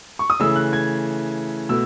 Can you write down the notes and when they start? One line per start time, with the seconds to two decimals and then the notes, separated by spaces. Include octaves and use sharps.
0.19 C#6
0.30 D#6
0.39 C#3 E3 A3 E6
0.56 F#6
0.73 G#6
1.69 B2 A3 E6